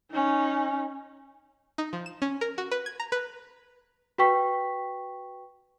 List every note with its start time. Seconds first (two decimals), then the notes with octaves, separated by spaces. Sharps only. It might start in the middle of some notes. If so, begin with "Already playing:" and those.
0.11 C#4 D#4
1.78 D#4
1.93 F3
2.06 E7
2.22 C#4
2.41 A#4
2.58 F#4
2.71 B4
2.86 G#6
3.00 A#5
3.12 B4
4.18 F#4 B4 G5 C#6 B6